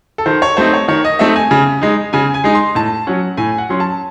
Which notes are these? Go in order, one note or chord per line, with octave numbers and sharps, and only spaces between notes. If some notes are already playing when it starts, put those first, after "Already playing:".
A4
D#3 C5
C#5
A3 C4 D#4 C5
C#5
D#3 C#5
D#5
A3 C4 D#4 E5
G#5
C#3
G#3 D#4
C#3 G#5
G#5
G#3 D#4
C6
A2 A5
F#3 C#4 F#5
A2 G#5
F#5
F#3 C#4 C6
A5